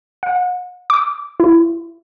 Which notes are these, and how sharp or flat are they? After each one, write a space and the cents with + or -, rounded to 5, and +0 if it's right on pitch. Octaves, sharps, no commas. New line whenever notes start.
F#5 -40
D6 -20
E4 +25